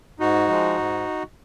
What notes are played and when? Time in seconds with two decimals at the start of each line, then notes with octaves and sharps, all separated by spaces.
0.20 G#2 D#4 F#4
0.49 F3 G#3
0.77 G#2